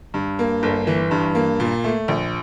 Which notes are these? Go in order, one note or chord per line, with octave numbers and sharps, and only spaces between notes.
G2
A#3
G1
E3
G2
A#3
A#2
A3
A#1